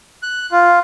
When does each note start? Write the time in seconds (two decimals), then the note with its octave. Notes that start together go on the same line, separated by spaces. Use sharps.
0.23 F#6
0.52 F4